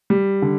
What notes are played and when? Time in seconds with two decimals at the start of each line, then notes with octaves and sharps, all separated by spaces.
0.10 G3
0.42 D3